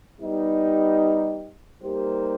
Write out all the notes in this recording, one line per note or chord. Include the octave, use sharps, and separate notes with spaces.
G3 B3 D#4 G4
G3 A#3 D#4 G4 C5